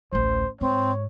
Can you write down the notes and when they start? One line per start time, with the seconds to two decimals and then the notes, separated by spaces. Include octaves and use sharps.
0.13 A1 D2 C5
0.61 G#2 C4 C#5